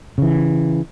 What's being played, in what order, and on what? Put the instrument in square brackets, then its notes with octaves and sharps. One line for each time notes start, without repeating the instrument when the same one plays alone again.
[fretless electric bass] C#3 E3